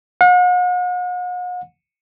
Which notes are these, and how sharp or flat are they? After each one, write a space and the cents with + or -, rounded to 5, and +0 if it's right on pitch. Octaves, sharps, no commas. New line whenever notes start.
F#5 -45